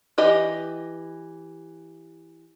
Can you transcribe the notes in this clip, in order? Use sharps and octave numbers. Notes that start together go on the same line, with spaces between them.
E3 G4 D#5